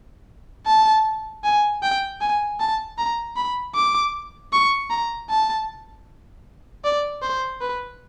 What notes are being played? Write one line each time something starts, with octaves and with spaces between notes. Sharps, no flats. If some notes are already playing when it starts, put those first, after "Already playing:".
A5
G#5
G5
G#5
A5
A#5
B5
D6
C#6
A#5
A5
D5
C5
B4